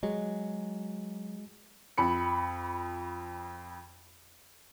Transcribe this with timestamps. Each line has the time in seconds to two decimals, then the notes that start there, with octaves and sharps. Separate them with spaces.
0.03 F#3 G#3
1.98 F2 B5 C#7